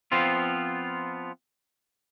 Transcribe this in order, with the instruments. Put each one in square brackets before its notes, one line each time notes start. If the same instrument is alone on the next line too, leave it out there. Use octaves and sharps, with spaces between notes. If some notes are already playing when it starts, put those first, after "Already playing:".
[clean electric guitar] F3 B3 C4 F4